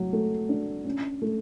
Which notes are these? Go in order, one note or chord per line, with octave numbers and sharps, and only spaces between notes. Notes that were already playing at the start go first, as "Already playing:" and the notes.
Already playing: F#3
A3
D4
C#4
A3